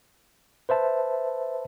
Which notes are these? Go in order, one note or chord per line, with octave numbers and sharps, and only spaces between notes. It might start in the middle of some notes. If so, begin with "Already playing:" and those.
B4 C5 E5 A5